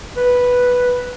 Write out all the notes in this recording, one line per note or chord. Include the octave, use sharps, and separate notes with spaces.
B4